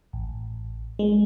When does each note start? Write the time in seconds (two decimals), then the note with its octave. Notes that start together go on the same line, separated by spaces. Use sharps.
0.13 A1
0.99 G#3